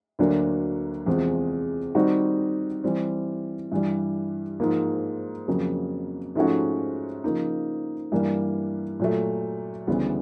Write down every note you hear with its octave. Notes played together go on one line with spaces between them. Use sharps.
D2 D3 F#3 A#3 D4
E2 C3 F3 G#3 C4
D#3 G3 C4 D#4 F#4
E3 G3 C4
G2 E3 G3
G#2 F3 A#3
F2 C#3 F#3 A#3
G#2 F3 A3 C#4 F#4
C#3 F3 A#3 D#4
G2 E3 G3 A#3
A#2 F#3 A3
D2 C#3 E3 G3 B3